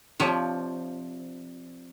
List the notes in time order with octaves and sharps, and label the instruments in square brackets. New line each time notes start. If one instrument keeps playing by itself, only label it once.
[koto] C3 F3 [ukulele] D4 F4 C#5